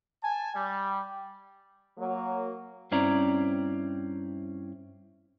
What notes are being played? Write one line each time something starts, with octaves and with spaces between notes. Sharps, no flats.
G#5 A5
G3
F#3 A#3
G2 C4 C#4 E4 D5 A#5